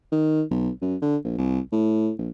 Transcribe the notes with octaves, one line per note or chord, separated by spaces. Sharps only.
D#3
B1
F#2
D3
A#1
C2
A2
A#1